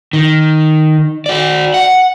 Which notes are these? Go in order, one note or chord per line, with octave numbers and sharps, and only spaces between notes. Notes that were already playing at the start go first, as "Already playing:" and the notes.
D#3
F#4 D5
F#5